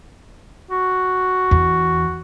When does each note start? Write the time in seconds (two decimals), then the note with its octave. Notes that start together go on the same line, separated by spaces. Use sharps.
0.71 F#4
1.51 E2